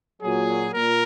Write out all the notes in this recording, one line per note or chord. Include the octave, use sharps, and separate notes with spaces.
A#2 F#3 G#4
A#2 A#4